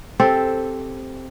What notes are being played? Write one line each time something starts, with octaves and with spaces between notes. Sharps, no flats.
C4 G4 A4